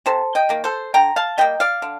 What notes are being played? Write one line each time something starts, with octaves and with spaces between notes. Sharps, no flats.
C3 A4 C5
D#5 G5
D#3 A#3
A4 C5
D3 G5 A#5
F5 A5
G3 A#3 D#5 G5
D5 F5
D3